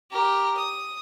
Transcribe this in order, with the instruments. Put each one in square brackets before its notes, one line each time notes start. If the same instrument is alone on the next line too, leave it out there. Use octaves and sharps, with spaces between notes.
[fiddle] G4 A#4
D#6